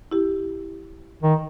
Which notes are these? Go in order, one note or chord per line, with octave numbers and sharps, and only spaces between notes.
E4 G4
D#3